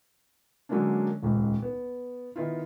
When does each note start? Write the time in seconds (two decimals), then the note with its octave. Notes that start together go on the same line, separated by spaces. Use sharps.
0.69 D3 F#3 G#3 A#3 C#4 D4
1.22 D#1 C#2 G#2
1.62 B3
2.36 D#3 B3 E4 F4